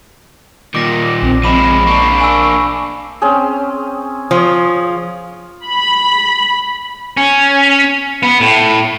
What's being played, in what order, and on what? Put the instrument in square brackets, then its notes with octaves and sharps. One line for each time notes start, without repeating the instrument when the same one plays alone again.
[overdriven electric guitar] A#2 D#3 [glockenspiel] D6 A#6
[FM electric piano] A#1 [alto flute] C4
[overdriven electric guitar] F3 G#3 [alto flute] C4 [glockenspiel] B5 D6 E7
[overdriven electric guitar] A#3 D4 [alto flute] C#6
[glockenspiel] G#5 E6
[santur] C4 C#4 G#4
[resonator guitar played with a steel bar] F3 [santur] C#5 D#6
[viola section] B5
[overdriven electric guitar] C#4
B3
A2